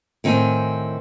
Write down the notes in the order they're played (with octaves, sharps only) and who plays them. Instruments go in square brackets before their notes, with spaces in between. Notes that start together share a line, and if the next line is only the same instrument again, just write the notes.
[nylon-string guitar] A2 D#3 C4 G#5